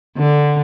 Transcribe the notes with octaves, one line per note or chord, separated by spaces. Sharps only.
D3